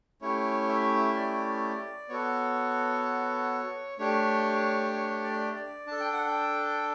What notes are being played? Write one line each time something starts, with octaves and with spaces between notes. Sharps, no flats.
A3 C#4 E4 G4 C#5
E5
D5
B3 F#4 A4 C#5
A3 D4 G4 C#5
C#5
D5
D5
D4 A4 A5
G5
F#5
G5